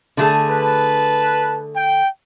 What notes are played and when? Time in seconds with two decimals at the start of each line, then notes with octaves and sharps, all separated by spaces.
0.17 D3 A3 G#4
0.50 B4 A5
1.76 G5